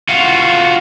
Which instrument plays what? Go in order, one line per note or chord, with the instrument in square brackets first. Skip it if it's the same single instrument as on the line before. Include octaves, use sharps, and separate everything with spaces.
[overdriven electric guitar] F4 F#4